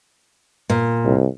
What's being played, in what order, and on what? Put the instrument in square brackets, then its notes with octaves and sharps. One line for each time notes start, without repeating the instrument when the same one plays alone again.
[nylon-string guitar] A#2
[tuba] C2